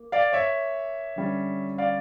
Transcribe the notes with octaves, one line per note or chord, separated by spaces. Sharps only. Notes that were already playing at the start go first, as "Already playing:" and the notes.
Already playing: A#3
D5 F5
C#5 E5
D3 G3 C#4
D5 F5